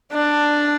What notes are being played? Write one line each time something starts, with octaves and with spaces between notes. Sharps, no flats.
D4